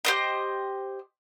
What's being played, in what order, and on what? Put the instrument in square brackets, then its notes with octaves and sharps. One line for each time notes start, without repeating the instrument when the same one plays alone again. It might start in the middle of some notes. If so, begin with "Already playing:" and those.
[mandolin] G4 C5 D#5